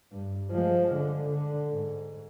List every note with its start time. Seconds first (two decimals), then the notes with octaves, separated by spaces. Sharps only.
0.12 G2
0.52 F3 G#3
0.96 D3
1.30 D3
1.73 G#2